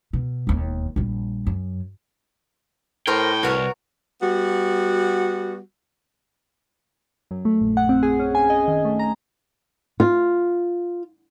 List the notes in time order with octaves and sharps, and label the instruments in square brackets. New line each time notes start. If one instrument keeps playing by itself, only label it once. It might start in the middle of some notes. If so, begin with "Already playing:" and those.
[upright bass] B2
E1 D#2
A#1 G3
F#2
[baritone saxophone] A2 [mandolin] A#4 C5 A#5 [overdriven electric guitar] G5
[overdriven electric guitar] C2 [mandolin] F#4 A#4 C#5 [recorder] B4
[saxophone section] G3 B3 F#4
[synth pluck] F#2
A3
A#1
F#5
C4
G#4
C#4
G#5
D#5
D#3
A3
A#5
[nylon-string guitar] F4